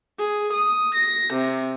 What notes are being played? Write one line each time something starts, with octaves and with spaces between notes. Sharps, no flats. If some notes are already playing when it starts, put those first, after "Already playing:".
G#4
D#6
A#6
C3